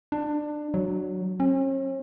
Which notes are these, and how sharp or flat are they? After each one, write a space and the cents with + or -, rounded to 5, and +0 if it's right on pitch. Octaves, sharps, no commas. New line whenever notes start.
D4 +20
F#3 +0
C#4 -45